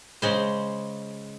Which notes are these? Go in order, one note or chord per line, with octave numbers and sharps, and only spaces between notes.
C#3 G#3 C5